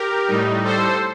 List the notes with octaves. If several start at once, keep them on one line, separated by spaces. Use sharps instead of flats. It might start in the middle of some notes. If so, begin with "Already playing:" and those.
Already playing: G4 A#4
A2 G3 D#4
A4 C5